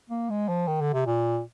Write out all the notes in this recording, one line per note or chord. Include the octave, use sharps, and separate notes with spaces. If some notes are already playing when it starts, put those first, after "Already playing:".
A#3
G#3
F3
D#3
D3
C3
A#2